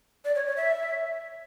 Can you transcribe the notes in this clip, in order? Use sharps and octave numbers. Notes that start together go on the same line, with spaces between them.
D5
C#5
C#5
E5